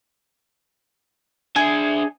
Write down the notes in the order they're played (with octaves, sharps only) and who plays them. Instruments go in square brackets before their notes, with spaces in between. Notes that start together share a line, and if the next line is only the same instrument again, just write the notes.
[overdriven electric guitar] D4 E5 [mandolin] G#4